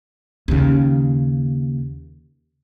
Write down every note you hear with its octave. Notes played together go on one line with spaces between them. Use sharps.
D#2 C#3